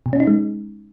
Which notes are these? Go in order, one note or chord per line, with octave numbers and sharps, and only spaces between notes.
B2
C#4
D#4
G#3